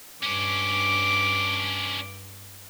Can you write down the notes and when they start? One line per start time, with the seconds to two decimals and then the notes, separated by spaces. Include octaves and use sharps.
0.23 G2 C#4 D4 D6